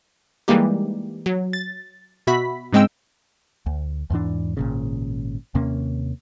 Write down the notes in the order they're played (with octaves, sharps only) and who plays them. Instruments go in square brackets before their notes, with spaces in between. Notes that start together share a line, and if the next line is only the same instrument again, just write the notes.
[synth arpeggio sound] E3 G3 G#3 A#3 D#4 G4
F#3
A6
B2 F#4 E5 B5 B6
G#2 C#3 G#3 C4 G5 E6
[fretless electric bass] D2
E2 G#2 E3 D4
G#1 A#2 C#3
D#2 C3 A#3 C#4